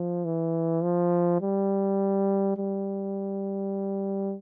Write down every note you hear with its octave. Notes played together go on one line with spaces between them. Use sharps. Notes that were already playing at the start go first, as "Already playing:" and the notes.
Already playing: F3
E3
F3
G3
G3